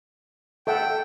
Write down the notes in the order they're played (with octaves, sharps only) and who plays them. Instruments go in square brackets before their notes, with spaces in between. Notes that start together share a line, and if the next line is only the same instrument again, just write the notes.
[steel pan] A4 E5 F#5 [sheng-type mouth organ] G5